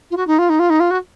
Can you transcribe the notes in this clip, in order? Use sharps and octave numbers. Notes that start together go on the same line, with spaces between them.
F4
F#4
D#4
F4
D#4
F4
D#4
F4
F#4